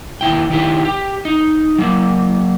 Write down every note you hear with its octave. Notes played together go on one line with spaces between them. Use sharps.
D#2 E4 G5
D#3 E4 G4
G4
D#4
F#3 A#3